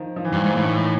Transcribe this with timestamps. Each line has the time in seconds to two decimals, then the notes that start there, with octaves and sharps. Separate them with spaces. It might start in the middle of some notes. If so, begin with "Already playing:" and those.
Already playing: D#3 F3
0.16 F3
0.25 E3
0.32 G2
0.44 G#2
0.55 A2 E3
0.64 D#3
0.72 E3